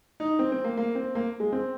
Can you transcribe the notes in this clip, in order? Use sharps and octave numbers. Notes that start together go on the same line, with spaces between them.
D#4
C4
C4
A#3
A#3
C4
A#3
G#3
C4